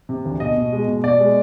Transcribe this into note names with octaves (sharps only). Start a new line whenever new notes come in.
C3
D2
B2 D#5
B2
G#3
B2
B2 D5
G#3